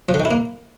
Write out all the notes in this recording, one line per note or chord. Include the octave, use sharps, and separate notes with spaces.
F3
D3
D#3
E4
A#3